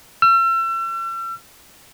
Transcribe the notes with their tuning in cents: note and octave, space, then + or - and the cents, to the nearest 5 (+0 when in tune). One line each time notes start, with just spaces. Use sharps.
E6 +40